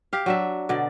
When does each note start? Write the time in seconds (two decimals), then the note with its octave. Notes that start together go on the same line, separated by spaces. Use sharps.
0.13 G4 F5
0.26 F#3 D4 E5
0.69 B2 D3 D5